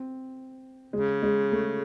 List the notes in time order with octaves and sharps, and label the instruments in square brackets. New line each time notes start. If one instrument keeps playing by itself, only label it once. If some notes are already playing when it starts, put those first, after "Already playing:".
Already playing: [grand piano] C4
[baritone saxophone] C#3 [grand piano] G#3
[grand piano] G#3
A3